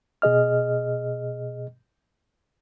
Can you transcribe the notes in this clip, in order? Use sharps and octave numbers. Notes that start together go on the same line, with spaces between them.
B2 G#4 D#5 F6